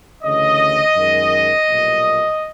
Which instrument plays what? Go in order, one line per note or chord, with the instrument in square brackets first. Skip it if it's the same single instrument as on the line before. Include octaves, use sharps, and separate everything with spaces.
[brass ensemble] D2 C#3 E3 D#5
F#2 D#3 G#3
B1 A#2 G3